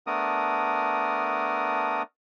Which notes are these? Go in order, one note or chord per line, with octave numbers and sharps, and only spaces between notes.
A3 B3 D4 A#4 D#6